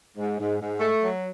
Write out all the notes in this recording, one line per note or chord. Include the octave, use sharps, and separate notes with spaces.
G#2
G#2
G#2
A3
F#3